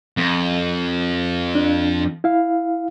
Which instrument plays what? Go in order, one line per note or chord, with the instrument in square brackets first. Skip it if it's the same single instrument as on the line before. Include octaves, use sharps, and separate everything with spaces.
[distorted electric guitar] F2
[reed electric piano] D4
E4 F5